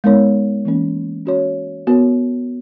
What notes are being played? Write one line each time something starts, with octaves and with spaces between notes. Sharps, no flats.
G#3 B3 D#4 A#4 C#5
E3 A#3 C#4
C#4 F#4 C#5
B3 F#4 A#4 C#5